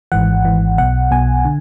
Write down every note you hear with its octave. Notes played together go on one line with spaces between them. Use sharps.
G#1 G#2 E3 F#5
G#1 G#2 E3
B1 B2 F#5
B1 B2 G#5
D3